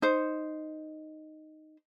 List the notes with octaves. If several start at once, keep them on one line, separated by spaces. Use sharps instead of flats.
D#4 C5